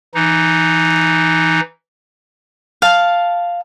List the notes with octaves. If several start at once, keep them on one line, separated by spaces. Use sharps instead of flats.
E3 D#4
F5 A5